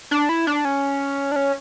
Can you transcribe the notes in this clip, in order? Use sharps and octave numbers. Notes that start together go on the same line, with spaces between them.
D4
E4
D4
C#4
D4
C#4